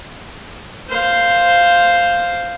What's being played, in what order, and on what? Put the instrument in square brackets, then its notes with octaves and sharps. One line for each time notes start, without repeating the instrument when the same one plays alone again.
[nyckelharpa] C5 F5